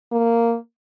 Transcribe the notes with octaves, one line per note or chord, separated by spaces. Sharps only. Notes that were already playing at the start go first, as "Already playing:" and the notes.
A#3